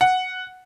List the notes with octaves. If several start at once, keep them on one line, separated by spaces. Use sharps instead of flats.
F#5